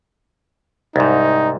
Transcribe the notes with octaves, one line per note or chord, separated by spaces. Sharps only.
C2 G#2 D#4